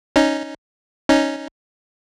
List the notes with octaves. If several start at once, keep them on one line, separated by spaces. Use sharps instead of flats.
C#4 D#4
C#4 D#4